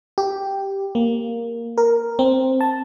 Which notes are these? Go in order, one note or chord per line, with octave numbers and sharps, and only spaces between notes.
G4
A#3
A#4
C4
A5